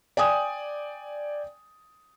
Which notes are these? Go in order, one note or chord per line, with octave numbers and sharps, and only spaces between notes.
D5 G5 G#5 D#6